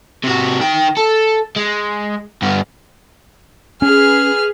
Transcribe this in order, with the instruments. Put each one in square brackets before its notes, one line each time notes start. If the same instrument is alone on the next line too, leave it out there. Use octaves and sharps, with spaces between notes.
[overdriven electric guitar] C3 F#4
D#3 G5
A4
G#3
G2 B3
[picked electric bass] C#4 [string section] G#4 B4 [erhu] F6